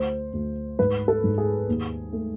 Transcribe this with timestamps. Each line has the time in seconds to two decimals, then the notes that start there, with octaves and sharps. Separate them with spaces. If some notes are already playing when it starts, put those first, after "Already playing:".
Already playing: D2 C5
0.33 D2
0.79 G#2 B4
1.08 A4
1.24 G#2
1.38 G#4
1.69 D#2
2.13 A3